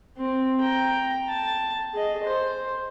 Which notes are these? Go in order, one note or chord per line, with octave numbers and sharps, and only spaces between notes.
C4
G5 A#5
A5
G#4 D#5
C5